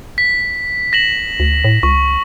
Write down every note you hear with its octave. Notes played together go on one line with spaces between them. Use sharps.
B6
A#6 E7 F#7
D2
A2
C#2 C#6